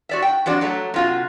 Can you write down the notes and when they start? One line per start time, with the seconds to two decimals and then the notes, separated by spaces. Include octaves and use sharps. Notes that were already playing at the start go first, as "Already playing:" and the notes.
0.09 F#4 D5 E5
0.22 G5
0.46 F2 D4 F#4 D5
0.61 F#3 A3 A#5
0.94 C3 F4 F#4